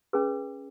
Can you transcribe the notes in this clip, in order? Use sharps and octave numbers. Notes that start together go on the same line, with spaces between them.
C#4 G#4 B4